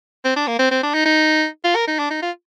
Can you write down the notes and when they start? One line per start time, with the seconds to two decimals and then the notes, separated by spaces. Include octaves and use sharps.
0.25 C4
0.36 D4
0.47 A#3
0.59 C4
0.71 C4
0.83 D4
0.94 D#4
1.06 D#4
1.64 F4
1.76 A#4
1.87 D#4
1.99 D4
2.11 D#4
2.22 F4